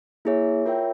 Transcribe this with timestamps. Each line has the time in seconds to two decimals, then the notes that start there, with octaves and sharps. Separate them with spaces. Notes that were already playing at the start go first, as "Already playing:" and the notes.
0.25 A#3 E4 G#4 C#5 E5
0.66 F4 A#4 C#5 E5 G5